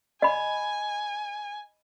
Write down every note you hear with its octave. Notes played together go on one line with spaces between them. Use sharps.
D#5 G#5 B5